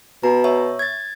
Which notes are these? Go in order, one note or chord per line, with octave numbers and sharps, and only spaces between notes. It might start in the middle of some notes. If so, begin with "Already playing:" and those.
B2 A#5
C#5 E5
G#6 A6